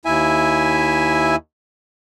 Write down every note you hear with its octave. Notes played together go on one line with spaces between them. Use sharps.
D#2 E4 E5 G#5